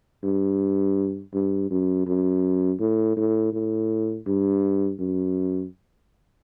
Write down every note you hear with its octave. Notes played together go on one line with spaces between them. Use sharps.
G2
G2
F#2
F#2
A2
A2
A2
G2
F#2